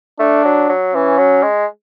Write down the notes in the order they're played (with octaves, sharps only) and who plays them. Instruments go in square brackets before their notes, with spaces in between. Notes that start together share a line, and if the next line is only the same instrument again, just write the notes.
[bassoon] A3 [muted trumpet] D4
[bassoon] F#3
F#3
[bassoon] E3 [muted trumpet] C#4
[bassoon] F#3
G#3